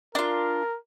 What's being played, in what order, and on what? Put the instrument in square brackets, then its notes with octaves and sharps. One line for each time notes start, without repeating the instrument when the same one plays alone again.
[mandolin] D4 F4 [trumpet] A#4